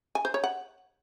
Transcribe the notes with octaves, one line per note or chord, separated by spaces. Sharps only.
G#5
C5
C#5
F#5